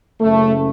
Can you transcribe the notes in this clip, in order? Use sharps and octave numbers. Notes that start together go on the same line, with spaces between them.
F#1 F#2 C#3 A3